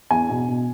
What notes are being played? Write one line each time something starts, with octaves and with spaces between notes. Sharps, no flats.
E2 G#5
B2
B2